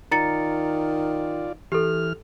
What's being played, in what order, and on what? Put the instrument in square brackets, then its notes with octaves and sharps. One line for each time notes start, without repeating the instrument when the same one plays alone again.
[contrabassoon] D#3 [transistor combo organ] F4 D5 [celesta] A#5 A6 C#7
[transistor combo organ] E3 F6 [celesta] G4 A4